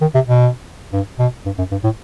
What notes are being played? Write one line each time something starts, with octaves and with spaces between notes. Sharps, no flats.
D#3
C3
B2
G2
B2
G2
F#2
G2
A2